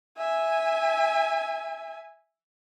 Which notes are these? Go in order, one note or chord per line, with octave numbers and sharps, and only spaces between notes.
E5 G#5